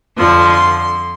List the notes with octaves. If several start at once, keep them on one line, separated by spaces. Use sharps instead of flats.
F2 D3 F3 C6
C6